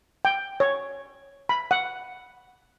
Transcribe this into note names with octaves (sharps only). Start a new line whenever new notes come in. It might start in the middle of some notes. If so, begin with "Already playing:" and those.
G5
C#5
B5
F#5